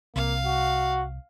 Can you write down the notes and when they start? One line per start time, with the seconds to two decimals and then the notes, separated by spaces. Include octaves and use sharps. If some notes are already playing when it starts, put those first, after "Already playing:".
0.16 C2 A#3 F5
0.46 F#4